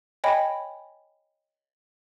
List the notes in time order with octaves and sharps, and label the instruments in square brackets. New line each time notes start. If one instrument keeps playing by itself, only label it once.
[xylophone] C#5 D#5 G5 G#5 B5